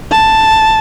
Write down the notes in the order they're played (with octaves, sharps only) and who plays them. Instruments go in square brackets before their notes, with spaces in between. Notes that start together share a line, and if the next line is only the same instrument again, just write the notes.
[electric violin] A5